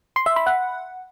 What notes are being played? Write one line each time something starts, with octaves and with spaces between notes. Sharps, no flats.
C6
E5
B5
F#5